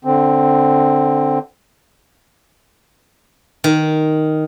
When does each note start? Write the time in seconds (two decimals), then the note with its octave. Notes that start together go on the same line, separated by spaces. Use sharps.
0.05 D3 C4
3.64 D#3